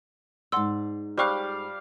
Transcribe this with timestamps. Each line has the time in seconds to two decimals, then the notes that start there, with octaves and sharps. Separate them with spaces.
0.52 G#2 D5 F#5 C6 E6
1.18 G3 C5 F5 C#6 F#6